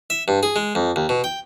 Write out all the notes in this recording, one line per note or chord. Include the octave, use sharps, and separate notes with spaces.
E5
G2
G#4
G#3
F2
D#2
B2
G5